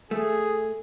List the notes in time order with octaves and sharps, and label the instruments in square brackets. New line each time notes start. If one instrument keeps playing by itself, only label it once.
[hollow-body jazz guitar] A3 [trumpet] G#4